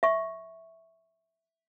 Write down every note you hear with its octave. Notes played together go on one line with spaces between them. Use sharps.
E5 C#6